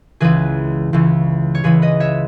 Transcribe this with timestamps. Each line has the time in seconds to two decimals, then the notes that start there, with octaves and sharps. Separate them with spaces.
0.20 C#2 C#3 E3 G#4 B4
0.93 C#2 C#3 E3
1.55 C#5
1.64 C#2 C#3 E3 G#4 B4
1.82 B4 D#5
2.00 C#5 E5